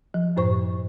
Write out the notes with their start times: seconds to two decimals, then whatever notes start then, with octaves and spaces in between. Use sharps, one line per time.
0.14 F3
0.36 F#2 A2 C5 C#6